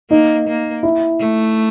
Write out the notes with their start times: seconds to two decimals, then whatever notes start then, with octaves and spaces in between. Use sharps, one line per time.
0.11 A#3 D#4
0.48 A#3
0.83 E4
1.20 A3